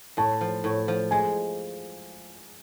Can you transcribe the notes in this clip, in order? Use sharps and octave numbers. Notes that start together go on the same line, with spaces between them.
A2 A5
F3
A2
F3
G#3 G#5